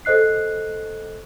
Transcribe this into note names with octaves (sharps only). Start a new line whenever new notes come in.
A4 C5 D#5 F#6 C7